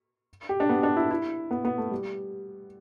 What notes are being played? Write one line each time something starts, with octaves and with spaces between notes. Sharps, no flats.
G4
D4
B3
D4
E4
E4
B3
B3
A3
G3